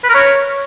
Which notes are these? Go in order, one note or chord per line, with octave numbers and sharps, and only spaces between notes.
B4
A#4
C#5